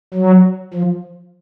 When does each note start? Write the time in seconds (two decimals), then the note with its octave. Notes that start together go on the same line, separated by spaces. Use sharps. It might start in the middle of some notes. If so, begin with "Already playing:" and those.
0.14 F#3
0.74 F3